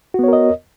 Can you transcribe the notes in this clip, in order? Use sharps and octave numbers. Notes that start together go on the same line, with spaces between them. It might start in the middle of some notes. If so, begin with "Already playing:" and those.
B3 F#4 A#4 C#5 D#5